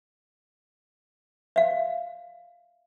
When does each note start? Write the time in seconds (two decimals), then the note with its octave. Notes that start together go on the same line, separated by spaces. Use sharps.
1.56 E5 F5